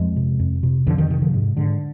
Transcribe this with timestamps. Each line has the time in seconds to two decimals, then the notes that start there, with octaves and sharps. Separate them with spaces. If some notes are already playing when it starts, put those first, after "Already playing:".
Already playing: F2 F3 G#3
0.16 C3
0.39 F2
0.63 C3
0.87 F2 D3 F3
0.98 D#3
1.10 C3 D#3
1.22 D3 F3
1.33 G#2
1.57 G#2 D3